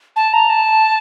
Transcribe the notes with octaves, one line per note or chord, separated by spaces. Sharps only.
A5
A#5
A5